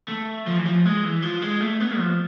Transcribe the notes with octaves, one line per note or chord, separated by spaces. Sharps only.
A3
F3
E3
F3
G#3
E3
F3
G#3
A3
B3
F3